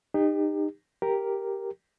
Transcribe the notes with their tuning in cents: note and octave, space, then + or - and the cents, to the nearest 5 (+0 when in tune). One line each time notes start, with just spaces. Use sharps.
D#4 -25 G4 +30
G4 +0 A#4 +0